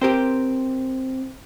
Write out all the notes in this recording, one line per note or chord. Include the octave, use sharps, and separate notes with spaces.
C4 G4 A#4 C5